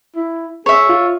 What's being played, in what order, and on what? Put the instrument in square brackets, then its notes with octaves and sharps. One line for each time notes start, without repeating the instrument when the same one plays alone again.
[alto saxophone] E4
[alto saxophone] G#4 [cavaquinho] C#5 E5
[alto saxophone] F4